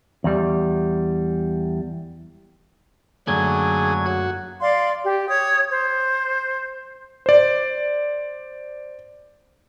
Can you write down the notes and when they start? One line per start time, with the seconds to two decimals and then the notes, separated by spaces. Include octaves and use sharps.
0.24 E2 G3
3.27 F#2 D3 F#3 A3 A#3 G#4 G#6
4.05 F#4
4.62 D5 F5 C6
5.05 G4
5.29 C#5 D#6
5.71 C5
7.26 C5 D5